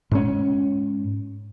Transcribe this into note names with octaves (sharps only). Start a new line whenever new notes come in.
G#2 C#4